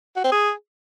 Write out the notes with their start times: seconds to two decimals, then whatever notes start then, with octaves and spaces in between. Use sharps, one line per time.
0.16 F#4
0.24 C4
0.32 G#4